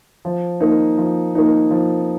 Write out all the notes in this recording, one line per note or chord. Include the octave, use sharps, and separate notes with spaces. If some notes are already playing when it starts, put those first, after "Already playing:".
F3
A#3 D#4
F3
A#3 D#4
F3